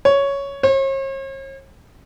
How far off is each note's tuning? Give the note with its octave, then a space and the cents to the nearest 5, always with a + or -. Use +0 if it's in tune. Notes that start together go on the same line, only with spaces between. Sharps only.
C#5 +5
C#5 -45